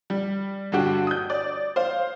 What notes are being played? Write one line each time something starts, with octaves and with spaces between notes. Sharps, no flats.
G3
G2 D3 F#4 G4
D#6 G6
D5
C5 F5